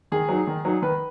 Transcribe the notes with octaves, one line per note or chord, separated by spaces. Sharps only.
D#3 G#4
F#3 D#4
D#3
F#3 D#4
D#3 B4